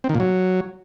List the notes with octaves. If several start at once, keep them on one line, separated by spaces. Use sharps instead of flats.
C4
D#3
A#2
F#3